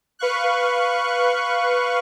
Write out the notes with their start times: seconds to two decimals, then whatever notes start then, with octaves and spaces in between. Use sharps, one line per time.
0.19 B4 F5 C#6 F#6